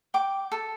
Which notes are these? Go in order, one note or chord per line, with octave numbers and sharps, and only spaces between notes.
G5 D6
A4